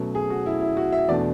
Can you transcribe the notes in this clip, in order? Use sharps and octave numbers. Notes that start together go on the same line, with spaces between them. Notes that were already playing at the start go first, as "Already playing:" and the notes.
Already playing: B2 F#3 A3 C#4
G#4
F#4
E4
E4
F#4
E5
E2 B2 A3 D4 D5